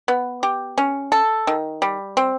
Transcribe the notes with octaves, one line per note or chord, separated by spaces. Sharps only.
B3
G4
C#4
A4
D#3
G3
C4